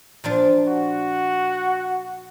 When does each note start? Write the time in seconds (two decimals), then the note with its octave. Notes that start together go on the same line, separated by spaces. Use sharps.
0.24 A#2 F3 D4
0.68 F#4